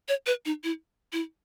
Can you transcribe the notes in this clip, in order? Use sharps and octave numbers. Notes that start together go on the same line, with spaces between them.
C#5
B4
D#4
E4
E4